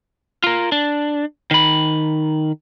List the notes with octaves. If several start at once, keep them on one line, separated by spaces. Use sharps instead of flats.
F4 A#4
D4
D#3 B5